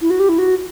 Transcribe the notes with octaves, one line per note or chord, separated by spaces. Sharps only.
E4
F#4
G4
E4
F#4